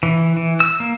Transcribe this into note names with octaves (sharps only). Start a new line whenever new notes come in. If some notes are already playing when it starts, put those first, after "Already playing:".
E3
E3
E6
A#3